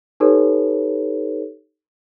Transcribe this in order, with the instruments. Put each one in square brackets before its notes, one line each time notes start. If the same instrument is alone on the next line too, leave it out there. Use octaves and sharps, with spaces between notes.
[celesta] D#4 G4 A4 B4 C#5